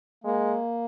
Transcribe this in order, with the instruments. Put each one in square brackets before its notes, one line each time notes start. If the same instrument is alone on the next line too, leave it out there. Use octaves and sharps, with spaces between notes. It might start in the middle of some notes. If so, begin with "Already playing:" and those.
[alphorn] G#3 [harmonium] A#3